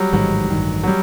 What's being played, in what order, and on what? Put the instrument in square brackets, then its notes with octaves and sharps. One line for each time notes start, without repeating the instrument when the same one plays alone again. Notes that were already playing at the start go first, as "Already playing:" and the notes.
Already playing: [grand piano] F#3 G3
[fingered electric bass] A1 G#2 D#3 [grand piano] F#3
[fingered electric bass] A1 G2 D#3
[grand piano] F#3
G3